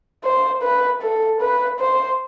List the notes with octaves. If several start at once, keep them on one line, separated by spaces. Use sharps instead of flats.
C5
B4
A4
B4
C5